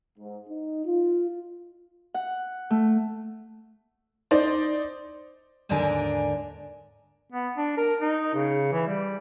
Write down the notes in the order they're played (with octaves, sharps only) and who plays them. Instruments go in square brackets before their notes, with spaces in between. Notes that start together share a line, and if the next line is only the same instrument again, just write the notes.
[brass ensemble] G#2
D#4
F4
[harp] F#5
A3
[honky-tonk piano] D#4 C5 D5
[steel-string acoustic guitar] D#2 G#2 D3 D4 A#4 G#5
[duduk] B3
D4
A#4
D#4
C#3
E3
G3